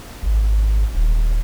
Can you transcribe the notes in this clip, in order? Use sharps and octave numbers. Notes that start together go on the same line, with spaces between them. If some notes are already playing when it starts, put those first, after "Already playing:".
G#1
D#1